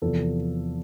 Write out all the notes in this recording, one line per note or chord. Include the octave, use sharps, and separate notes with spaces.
E2 C3 F3 A4